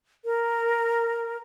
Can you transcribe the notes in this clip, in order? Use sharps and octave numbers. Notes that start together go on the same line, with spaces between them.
A#4